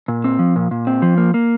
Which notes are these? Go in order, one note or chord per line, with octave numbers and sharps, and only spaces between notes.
A#2
C4
F3
A#2
A#2
C4
F3
A#3
A#3